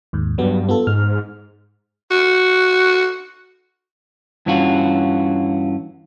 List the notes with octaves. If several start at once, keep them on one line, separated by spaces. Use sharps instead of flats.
D#2 G#2
G2 F#3 B3
B3 F4 A4
G#2 F6
F#4
G2 E3 C#4 F4 F#4